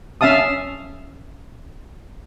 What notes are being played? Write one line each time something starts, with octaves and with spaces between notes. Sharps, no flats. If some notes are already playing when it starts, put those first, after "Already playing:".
C#4 E5 F5 A5 D#6